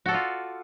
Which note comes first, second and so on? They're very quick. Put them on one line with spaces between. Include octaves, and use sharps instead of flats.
F#4 A4 D5 F4